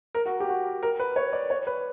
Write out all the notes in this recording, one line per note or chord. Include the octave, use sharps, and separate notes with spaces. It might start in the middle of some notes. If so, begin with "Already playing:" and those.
A#4
F#4
G4
F#4
A#4
B4
C#5
D5
C#5
B4